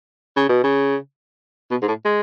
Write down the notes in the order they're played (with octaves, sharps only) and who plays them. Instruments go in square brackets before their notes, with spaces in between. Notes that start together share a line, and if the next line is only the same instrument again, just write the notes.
[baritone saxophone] C#3
B2
C#3
B2
G#2
A2
G#3